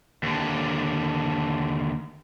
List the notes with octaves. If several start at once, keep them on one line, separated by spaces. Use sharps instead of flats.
D#2 D3